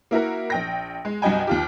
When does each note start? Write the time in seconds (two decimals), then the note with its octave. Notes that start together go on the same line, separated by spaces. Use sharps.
0.11 A#3 E4 F#4 A#4
0.50 A#1 G5 A#6
1.05 G#3
1.22 C2 G2 F#4 D#5 G5 G#5
1.47 D#2 F4 G4